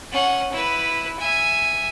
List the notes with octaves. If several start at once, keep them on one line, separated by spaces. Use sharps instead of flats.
C#4 F#5
E4 B4
E5 G#5